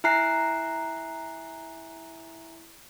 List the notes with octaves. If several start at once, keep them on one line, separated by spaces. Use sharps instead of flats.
E4 E5 G#5 A#5 F#6 C7